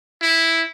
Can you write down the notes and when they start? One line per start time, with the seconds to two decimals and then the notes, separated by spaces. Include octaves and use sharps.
0.22 E4